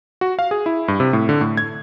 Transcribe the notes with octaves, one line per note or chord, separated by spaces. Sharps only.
F#4
F5
G#4
E4
G2
C3
A2
D3
A2
G#6